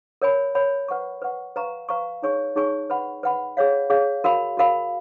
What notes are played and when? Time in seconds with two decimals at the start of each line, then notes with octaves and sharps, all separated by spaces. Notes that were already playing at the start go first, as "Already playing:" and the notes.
0.22 A#4 C#5 G#5 B5
0.55 A#4 C#5 G#5 B5
0.88 B4 F#5 C#6
1.22 B4 F#5 C#6
1.56 B4 F5 A#5 C#6
1.89 B4 F5 A#5 C#6
2.22 D#4 G#4 C#5 G#5 C#6
2.56 D#4 G#4 C#5 G#5 C#6
2.90 B4 F#5 B5
3.23 B4 F#5 B5
3.57 G#4 C#5 F5
3.90 G#4 C#5 F5
4.24 F#4 A#4 F5 B5
4.57 F#4 A#4 F5 B5